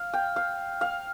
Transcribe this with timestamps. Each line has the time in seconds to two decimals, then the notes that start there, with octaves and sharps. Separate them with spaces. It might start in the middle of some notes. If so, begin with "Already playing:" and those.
Already playing: F5
0.14 G5
0.36 F5
0.81 F5